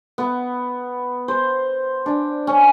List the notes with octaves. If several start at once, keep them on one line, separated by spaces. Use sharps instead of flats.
B3
C5
D4
C#4